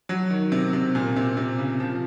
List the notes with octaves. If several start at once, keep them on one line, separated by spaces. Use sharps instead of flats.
F#3
D#3
C3
C3
A#2
C3
C3
C#3
F3